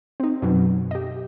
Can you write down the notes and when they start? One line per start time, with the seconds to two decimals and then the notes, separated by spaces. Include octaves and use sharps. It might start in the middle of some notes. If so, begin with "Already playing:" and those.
0.20 C4 D#4
0.42 F#2 B2 F#3
0.91 G4 D#5